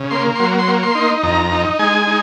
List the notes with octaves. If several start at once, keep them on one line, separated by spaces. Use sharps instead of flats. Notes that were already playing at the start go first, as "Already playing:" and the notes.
Already playing: C#3
A#3 C6
F#3 C6
C6
A#3
C6
D#4
F2 A#5
D#4
G#3 G#5
D#4